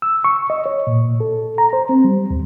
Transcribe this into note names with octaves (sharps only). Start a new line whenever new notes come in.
E6
C#6
D#5
C#5
A#2
A4
A#5
C5
C4
G3
D#2